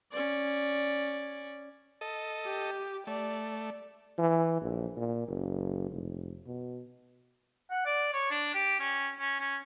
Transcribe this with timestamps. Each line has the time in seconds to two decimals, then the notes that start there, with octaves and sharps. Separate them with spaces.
0.12 C#4 D5
2.01 A4 D#5
2.45 G4
3.07 A3 D5
4.18 E3
4.61 A#1
4.97 A#2
5.28 F#1
5.91 F1
6.46 B2
7.70 F#5
7.85 D5
8.13 C#5
8.31 D4
8.54 G4
8.79 C#4
9.19 C#4
9.39 C#4